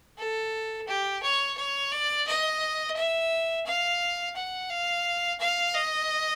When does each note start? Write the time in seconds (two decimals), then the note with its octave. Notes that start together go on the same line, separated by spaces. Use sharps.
0.18 A4
0.87 G4
1.22 C#5
1.57 C#5
1.91 D5
2.27 D#5
2.96 E5
3.66 F5
4.35 F#5
4.70 F5
5.40 F5
5.74 D#5